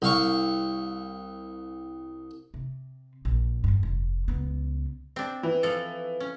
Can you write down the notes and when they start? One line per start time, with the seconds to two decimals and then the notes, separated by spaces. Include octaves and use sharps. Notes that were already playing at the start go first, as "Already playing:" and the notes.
0.02 C2 F5 C#6
2.54 C3
3.25 A#1
3.64 E2 G2
3.83 F1
4.28 C#2 B3
5.16 C4 D4
5.43 E3
5.63 F3 A4
6.20 C#4